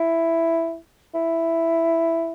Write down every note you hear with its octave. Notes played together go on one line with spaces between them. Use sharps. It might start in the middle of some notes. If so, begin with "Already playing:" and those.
Already playing: E4
E4